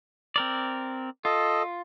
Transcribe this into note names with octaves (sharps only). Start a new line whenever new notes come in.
C4 A#4 D5
F4 A4 D#5